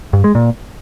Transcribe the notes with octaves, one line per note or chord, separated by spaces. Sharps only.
G2
G#3
A#2